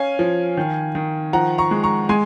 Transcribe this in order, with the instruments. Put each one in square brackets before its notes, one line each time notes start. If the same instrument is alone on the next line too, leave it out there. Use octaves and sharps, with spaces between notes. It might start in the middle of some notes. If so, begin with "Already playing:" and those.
Already playing: [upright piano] C#4 F5 G#5
F3
D#3
D#3
F3 F#5 A#5
A#5 C#6
G#3
A#5 C#6
G#3 G#5 C6